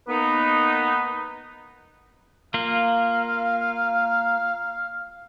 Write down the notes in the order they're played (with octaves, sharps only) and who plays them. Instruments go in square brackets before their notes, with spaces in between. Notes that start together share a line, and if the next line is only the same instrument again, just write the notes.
[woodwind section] A#3 B3 D#4 B4
[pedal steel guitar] A#3 F4 [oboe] F5